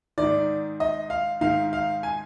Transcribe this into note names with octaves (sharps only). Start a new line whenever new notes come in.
G#2 D#3 D5
D#5
F5
G#2 D#3 F5
F5
G#5